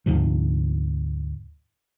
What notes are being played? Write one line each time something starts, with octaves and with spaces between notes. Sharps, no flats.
D2 G#2 C3 F3